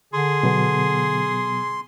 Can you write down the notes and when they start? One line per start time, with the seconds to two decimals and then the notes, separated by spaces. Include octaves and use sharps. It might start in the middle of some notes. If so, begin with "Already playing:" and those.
0.13 D3 G#4 C6
0.43 B2 F#3 B3